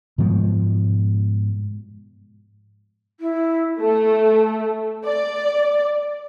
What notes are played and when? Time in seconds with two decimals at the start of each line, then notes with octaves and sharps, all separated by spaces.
0.18 G#2 B2 F3 G#3
3.20 E4
3.79 A3
5.05 D5